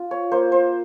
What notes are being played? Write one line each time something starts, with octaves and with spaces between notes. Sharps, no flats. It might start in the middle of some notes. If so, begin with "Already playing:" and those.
Already playing: F4
C#5
A#3 C5
C5